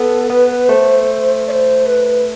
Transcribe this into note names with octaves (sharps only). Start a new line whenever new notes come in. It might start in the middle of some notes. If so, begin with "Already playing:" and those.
Already playing: B3 A4
B3 B4
A3 C5
D5
C5
B4